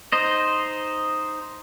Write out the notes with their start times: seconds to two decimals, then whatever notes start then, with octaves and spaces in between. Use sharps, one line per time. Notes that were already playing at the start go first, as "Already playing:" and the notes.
0.12 D#4 C5 D#5